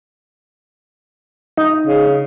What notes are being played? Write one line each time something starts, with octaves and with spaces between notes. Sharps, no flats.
D#4
C#3